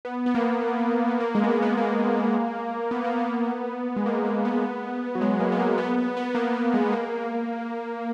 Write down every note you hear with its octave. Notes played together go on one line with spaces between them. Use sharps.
B3
B3
A#3
B3
A#3
G#3
B3
A#3
B3
B3
A#3
B3
A#3
B3
G#3
A#3
A#3
B3
F#3
G#3
A#3
B3
A#3
B3
B3
A#3
A#3
G#3
A#3